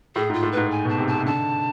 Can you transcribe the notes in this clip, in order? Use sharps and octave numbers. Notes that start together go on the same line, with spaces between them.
A2 G#4
G#2
F4
A2
G#2 B4
G#5
B2
A5
C3
A5
C3
D3 A5